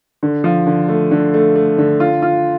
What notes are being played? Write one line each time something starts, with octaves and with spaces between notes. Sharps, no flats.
D3
F3
D3
A3
D3
A3
A3
D3
F4
F4